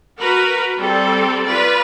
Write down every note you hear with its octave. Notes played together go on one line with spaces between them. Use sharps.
F#4 A#4 B4
G3 C4 A4
F4 B4 D5